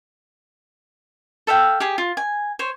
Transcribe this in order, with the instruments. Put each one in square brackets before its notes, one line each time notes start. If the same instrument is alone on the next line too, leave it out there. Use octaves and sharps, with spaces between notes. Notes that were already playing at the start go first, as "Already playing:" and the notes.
[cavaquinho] A4 E5 F5 G5
G4 G#4
F4
G#5
C5 C#5